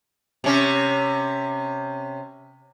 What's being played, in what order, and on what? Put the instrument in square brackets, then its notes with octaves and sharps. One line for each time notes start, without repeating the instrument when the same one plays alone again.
[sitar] C3 C#4